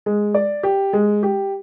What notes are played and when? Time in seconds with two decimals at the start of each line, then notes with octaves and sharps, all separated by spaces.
0.06 G#3
0.34 D5
0.63 G4
0.93 G#3
1.23 G4